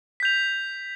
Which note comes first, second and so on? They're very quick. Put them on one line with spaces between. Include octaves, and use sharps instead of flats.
B6 G6 F7